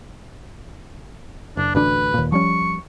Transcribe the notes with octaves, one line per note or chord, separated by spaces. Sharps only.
F#1 D4
A1 D2 D4 B4
D#2 A#2
F3 G3 C#4 C#6